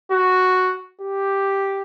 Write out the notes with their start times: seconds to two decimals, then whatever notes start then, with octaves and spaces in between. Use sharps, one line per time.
0.12 F#4
1.01 G4